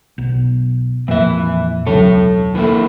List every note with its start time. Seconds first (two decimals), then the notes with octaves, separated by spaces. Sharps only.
0.18 B1
1.08 F2 A#2 E3 E5
1.87 E1 C#2 F#3 A4 C#5
2.55 E3 A#3 E4